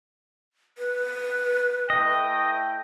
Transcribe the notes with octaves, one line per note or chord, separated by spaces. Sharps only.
B4
A3 E4 D#5 G5